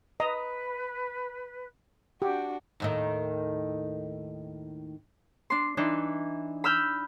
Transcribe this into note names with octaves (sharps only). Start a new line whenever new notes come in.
B4 D#5 A#5 D#6
D4 F#4 G4
D#2 A2 D#3
D4 C6
E3 D4 D#4
B5 E6 F6 G6